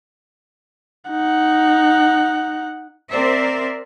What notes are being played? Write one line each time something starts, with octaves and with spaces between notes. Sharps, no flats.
D#4 F#5
C4 A#4 C5 D5 E5